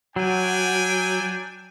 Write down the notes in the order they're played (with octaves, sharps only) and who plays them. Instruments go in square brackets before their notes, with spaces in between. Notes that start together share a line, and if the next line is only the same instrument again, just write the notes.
[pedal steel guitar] F#3 [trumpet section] D4 G5 G#5